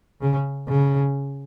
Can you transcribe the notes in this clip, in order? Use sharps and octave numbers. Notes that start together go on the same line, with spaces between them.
C#3
C#3